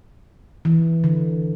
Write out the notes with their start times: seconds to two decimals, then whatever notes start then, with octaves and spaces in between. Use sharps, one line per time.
0.65 E3
1.04 D3